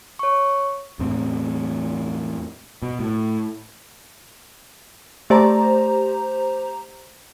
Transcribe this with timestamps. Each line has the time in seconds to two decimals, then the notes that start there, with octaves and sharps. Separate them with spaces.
0.19 C#5 C#6
0.99 E2 A2 C4
2.82 B2
3.00 A2
5.30 A3 G4 C5 D5 A#5